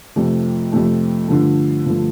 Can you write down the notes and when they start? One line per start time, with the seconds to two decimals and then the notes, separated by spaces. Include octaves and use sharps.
0.16 F2 C3 F3 A3
0.72 F2 C3 F3 A3
1.28 G2 D3 F3 A3
1.85 G2 D3 F3 A3